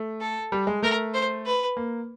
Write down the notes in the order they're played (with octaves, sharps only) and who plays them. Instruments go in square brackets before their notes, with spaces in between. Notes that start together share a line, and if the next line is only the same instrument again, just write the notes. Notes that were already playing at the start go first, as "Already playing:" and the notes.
Already playing: [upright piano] A3
[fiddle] A4
[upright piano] G3
G#3
[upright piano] A3 [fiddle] A#4
[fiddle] C5
B4
[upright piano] A#3